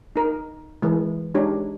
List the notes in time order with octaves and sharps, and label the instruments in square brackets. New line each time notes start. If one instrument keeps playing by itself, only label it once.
[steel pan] D#4 A#4
E3 G#3
G#3 D4 D#4 G4 C#5